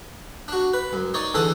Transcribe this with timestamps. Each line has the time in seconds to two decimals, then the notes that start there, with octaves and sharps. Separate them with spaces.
0.48 D4 F#4
0.74 B4
0.93 F#2
1.14 D#4 C#5 D5
1.34 E2 D3 D4 A4 D#6